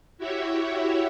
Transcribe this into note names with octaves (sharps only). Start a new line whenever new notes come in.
E4 F#4 G4 C#5 E5